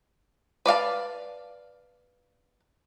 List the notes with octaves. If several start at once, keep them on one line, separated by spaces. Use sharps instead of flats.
B4 D5 F5 A5